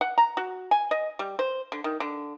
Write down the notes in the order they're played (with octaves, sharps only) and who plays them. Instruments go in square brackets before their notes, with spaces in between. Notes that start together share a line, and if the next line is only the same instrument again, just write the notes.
[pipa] F#5
A#5
F#4
G#5
D#5
G3
C5
D3
D#3
D3